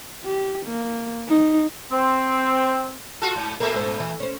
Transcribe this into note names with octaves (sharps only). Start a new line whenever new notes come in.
G4
A#3
D#4
C4
F4 F#4 A4 A5
G#2
A#2 A3 A4 A#4 E5
G#2 C#4 C5
E3
C#4 C5